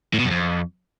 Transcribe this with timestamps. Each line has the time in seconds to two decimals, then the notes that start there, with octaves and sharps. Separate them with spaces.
0.13 A2
0.19 B2
0.25 F#2
0.31 F2